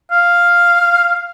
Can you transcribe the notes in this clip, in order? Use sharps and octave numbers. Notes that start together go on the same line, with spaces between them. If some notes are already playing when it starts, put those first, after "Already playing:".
F5